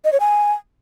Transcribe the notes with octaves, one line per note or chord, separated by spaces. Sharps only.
D#5
C#5
G#5